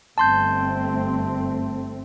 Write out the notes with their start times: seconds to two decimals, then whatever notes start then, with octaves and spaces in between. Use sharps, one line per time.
0.18 G1 A3 C4 A5 C6 G6